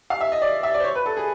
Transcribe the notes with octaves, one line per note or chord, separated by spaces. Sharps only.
F5
E5
D#5
D5
E5
D5
C5
C#5
B4
A4
G#4